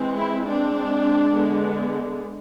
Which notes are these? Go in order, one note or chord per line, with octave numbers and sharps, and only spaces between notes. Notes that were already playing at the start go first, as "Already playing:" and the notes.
Already playing: E3 G#3 C4
E4
G#3 C4 D4
D3 G#3 B3